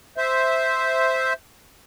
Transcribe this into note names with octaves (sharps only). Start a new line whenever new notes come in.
C5 E5